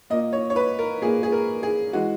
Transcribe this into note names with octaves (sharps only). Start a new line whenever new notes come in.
A#2 A#3 D#5
C#5
C#5
B4
A#4
A#2 A#3 G#4
G#4
A#4
G#4
E3 G#3 F#4